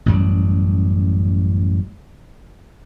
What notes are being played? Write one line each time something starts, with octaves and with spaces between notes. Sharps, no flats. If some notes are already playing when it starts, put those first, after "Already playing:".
A1 F#2 G3